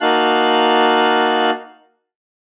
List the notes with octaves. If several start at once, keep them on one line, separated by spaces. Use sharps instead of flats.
A#3 D#4 F#4 F5 A5 F#6